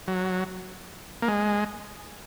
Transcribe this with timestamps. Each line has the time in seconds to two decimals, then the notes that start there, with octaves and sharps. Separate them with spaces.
0.08 F#3
1.22 A#3
1.28 G#3